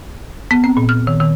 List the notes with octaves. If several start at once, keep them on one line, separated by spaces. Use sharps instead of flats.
B3
C4
A#2
F6
D#3
D#3